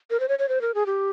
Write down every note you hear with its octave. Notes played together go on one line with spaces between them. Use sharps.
A#4
C5
C#5
C#5
C5
A#4
G#4
G4